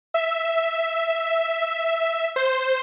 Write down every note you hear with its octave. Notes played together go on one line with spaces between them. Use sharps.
E5
C5